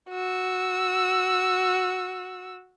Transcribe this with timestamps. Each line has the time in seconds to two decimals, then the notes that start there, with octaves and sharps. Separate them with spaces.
0.11 F#4 E6